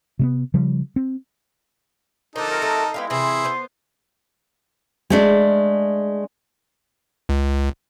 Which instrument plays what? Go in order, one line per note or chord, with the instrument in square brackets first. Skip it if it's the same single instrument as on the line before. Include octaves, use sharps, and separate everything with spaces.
[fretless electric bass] C3 A#3 B3
C#3 F3 G3
C4
[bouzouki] D#3 F3 [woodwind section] D4 [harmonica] D#4 A4
[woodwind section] C3 F#3 A#4
[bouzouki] A3
[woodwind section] G#3 E4 [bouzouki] B3 G4 F5
[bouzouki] C3 E3 [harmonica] E4 G#4 [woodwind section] C6
[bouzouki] B3 C5
[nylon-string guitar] G#3 A3 D4
[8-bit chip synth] C#2